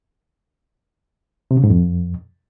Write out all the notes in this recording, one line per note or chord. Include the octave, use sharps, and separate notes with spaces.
C3
C#3
G#2
F2